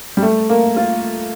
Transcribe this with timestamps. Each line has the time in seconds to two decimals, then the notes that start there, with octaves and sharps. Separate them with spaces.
0.17 G3
0.22 A3
0.50 A#3
0.77 F4